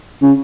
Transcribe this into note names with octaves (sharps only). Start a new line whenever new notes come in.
C#3